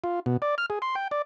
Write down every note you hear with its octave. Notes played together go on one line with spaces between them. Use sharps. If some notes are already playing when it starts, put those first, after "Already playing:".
F4
B2
D5
F6
G#4
C6
G5
D5